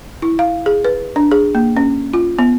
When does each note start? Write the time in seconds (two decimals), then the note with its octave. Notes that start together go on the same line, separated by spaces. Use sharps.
0.22 E4
0.39 F5
0.66 G#4
0.85 B4
1.16 D4
1.31 G#4
1.55 A#3
1.77 C#4
2.14 F4
2.39 B3